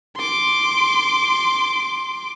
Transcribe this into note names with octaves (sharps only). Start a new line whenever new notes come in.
C6 D6